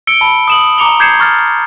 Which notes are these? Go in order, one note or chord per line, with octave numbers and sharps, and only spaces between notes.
E6 C#7 D7 G7
A5 B5
D#6 E7 F#7
A#5 D6 C#7 F7 G7
D6 G6 G#6 C7 C#7 E7
C#6 F6 A6